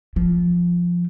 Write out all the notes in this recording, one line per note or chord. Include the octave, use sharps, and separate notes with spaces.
F3